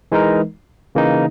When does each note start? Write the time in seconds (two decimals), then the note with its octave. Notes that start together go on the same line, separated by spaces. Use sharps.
0.12 E3 G#3 D#4 A#4
0.95 C#3 E3 A#3 D#4